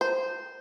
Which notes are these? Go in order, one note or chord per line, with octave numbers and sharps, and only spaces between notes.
C5